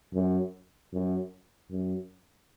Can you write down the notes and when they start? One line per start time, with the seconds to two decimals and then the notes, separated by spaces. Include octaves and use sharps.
0.14 F#2
0.92 F#2
1.71 F#2